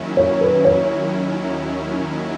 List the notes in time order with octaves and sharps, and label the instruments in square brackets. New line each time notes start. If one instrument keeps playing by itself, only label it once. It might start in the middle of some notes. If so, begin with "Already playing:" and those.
Already playing: [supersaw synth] D#2 D#3 F#3 C#4 E4
[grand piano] C#5
B4
C#5